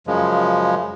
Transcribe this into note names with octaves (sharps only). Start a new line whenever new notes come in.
F#2 C#3 F3 G#3